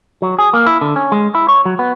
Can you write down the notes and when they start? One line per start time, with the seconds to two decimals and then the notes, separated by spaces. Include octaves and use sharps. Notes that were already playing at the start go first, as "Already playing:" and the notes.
0.22 F#3
0.39 G#4
0.53 A#3
0.67 E4
0.81 D3
0.96 C#4
1.12 G#3
1.35 E4
1.48 C#5
1.65 F#3
1.79 B3